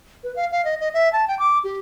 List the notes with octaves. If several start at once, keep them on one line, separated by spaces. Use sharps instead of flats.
B4
F5
F5
D#5
D#5
E5
A5
G5
D6
G4